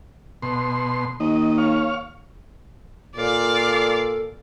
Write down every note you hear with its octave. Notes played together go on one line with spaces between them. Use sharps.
B2 C6
D#2 D#5
C#5 F5
A#2 A4 D5 F5